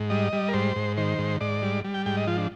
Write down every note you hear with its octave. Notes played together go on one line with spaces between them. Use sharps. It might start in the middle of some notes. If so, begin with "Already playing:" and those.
Already playing: G#2
G3 D#5
G3
A#4
G#2 C5
G#2
D#3 C5
G#2
G#2 D5
G3
G3
G5
G#2 G5
D#5
F3 F4
D4